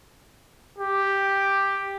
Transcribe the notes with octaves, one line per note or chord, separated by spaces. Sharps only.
G4